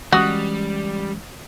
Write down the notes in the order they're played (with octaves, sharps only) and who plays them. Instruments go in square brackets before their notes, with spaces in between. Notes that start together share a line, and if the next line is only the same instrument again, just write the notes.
[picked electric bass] E3 G#3 C#4 [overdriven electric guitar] G3 [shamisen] F#4 [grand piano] D#6 F#6